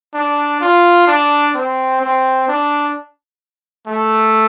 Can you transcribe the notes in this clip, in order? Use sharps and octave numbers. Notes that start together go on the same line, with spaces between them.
D4
F4
D4
C4
C4
D4
A3